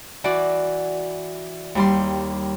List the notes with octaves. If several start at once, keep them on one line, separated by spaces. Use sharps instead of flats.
E3 F#4 D5
D#2 G3 C6